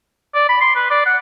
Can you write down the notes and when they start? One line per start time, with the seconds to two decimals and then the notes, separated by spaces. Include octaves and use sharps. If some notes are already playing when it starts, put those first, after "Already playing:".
0.34 D5
0.49 B5
0.61 C6
0.76 B4
0.90 D5
1.06 F#5